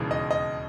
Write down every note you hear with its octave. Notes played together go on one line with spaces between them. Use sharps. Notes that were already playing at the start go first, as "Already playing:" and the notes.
Already playing: E1 D#2 C#3 E3
D#5
D#5